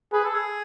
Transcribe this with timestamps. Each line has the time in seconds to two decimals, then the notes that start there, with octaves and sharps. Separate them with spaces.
0.13 G#4 B4
0.24 A4
0.35 G#4